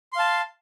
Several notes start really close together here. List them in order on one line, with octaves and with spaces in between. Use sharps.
C6 F5 A5